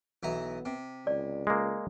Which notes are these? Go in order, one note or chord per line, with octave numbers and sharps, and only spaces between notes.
B1 E3 B3 A#5
C3
C#2 D5
G#3 A#3